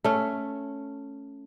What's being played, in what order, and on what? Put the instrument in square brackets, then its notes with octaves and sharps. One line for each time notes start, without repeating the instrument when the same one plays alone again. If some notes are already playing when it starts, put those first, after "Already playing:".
[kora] A3 C#4